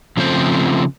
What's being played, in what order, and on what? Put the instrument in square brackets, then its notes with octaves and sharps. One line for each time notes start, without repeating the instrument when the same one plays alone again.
[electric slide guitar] C#3 F3 A3 C4 D4 C5